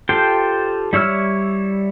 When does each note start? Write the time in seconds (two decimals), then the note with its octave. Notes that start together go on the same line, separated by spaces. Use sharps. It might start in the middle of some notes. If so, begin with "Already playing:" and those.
0.09 F4 G4 A4 C5 G5
0.93 G3 E4 C#5 E6 F6